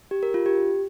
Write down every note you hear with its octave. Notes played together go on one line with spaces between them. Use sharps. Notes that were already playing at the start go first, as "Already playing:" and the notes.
G4
A#4
F4
G4